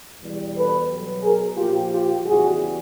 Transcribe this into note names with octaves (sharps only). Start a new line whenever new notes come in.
E2 B2 G3
A4 B4
B2 F#3
G#4 A#4
A#2 F3 F4 G4
F4 G4
E2 C#3 E3 G3 F#4 G#4